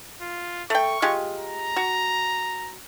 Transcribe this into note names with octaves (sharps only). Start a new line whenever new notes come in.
F4
A3 G5 C#6
G#3 F4 G4
A#5
F#4